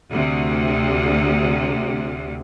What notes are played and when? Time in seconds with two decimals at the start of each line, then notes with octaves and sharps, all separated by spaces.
0.10 D2 C3